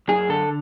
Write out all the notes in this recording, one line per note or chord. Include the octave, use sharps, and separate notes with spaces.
F#2 G#4
D3 A4